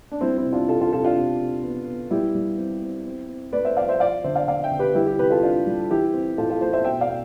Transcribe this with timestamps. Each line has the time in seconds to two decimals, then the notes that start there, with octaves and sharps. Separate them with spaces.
0.12 D4
0.21 G3 C4 E4
0.38 C4 E4
0.45 C3
0.53 D4 F4
0.69 C3 F4 A4
0.81 F4 A4
0.92 C3 F4 A4
1.04 D4 F4
1.17 C3
1.40 C3
1.63 B3
1.87 B3
2.11 G3 E4 G4
2.35 G3
2.58 C4
2.82 C4
3.06 C4
3.29 C4
3.53 A3 B4 D5
3.65 C5 E5
3.77 F3 D5 F5
3.88 C5 E5
4.00 F3 D5 F5
4.24 D3 C5 E5
4.36 D5 F5
4.48 D3 D5 F5
4.64 E5 G5
4.71 D3
4.79 G4 B4
4.95 G3 E4 G4
5.07 E4 G4
5.18 C3 G4 B4
5.30 F4 A4
5.43 C4 D4 F4
5.67 G3
5.90 E3 E4 G4
6.13 C4
6.38 A2 F4 A4
6.49 F4 A4
6.61 A3 A4 C5
6.73 C5 E5
6.84 B2 E5 G5
7.00 D5 F5
7.08 B2